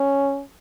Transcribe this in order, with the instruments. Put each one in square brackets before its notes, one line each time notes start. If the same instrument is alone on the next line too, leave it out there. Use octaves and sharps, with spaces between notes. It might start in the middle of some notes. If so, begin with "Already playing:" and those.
Already playing: [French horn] C#4